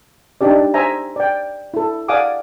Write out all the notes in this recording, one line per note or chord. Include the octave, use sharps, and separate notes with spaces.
D4 D#4 G4 D5
C5 E5 G#5 A#5
D5 G5
E4 A4
D5 F5 F#5 G#5 D6 D#6